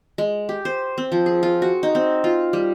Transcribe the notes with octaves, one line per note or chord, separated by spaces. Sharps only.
G#3
G4
C5
C4
F3
G#4
F4
F#4
D#4
C4
F4
G3